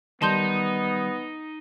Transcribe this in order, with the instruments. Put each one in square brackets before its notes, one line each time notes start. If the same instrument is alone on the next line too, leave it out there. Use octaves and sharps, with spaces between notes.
[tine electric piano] D#3 G3 [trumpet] B3 [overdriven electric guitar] D#4 [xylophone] A5 C6 G6